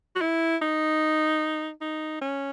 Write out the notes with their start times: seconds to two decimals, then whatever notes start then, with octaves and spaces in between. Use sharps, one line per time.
0.16 F#4
0.21 E4
0.61 D#4
1.81 D#4
2.21 C#4